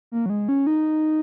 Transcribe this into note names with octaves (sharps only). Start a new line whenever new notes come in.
A#3
F#3
G#3
C#4
D#4